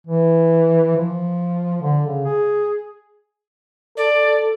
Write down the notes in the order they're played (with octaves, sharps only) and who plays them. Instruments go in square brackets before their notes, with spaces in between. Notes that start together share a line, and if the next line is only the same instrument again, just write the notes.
[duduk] E3
F3
D3
C#3
G#4
[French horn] A4 [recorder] D5